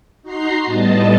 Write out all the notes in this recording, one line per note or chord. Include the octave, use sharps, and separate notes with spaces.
D#4 F#4 A#5 C6 C7
A2 G3 B3 D#5 A5